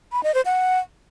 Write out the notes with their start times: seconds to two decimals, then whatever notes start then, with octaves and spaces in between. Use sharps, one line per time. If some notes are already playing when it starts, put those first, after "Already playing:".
0.12 B5
0.23 D#5
0.34 C5
0.45 F#5